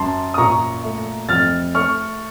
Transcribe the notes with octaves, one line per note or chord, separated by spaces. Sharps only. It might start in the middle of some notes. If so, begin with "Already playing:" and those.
Already playing: F#2 A5 C6
D#6
A#2 A#5 C#6
A3
F2 F6 A6
A3 C#6 F6